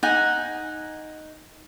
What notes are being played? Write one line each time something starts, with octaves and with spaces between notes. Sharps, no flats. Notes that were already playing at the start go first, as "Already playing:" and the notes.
D#4 F#5 G#5